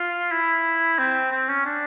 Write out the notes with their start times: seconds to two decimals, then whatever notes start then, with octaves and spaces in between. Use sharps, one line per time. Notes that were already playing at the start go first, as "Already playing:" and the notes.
Already playing: F4
0.31 E4
0.98 C4
1.31 C4
1.49 C#4
1.66 D4